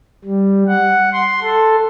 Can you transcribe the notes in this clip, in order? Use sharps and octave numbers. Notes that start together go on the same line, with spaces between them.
G3
F#5
C6
A4